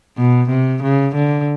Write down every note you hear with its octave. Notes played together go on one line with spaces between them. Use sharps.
B2
C3
C#3
D3